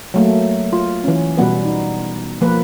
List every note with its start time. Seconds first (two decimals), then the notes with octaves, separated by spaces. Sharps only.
0.14 F#3 A3 A#3
0.73 F4
1.04 E3 C#4
1.37 B2 G3 B3 B4
1.65 D#4
2.41 F3 A#3 B4